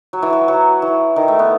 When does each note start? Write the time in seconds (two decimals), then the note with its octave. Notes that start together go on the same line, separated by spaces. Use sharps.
0.13 F#3
0.22 E3
0.33 F#3
0.48 F#3
0.82 E3
1.16 D#3
1.28 A3
1.39 B3